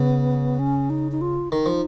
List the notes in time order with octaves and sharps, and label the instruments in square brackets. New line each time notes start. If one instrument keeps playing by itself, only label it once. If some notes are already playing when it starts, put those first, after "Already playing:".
Already playing: [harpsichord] C#3 [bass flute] B3
[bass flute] C#4
D#4
D#4
F4
[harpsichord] D#3 [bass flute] D#4
[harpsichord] F3